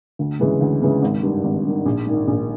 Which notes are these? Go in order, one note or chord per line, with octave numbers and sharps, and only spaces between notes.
D2
C#3 E3 G#3
D2
C#3 E3 G#3
G#1
G2 D#3
G#1
G2 D#3
A#1
G#2 D#3
A#1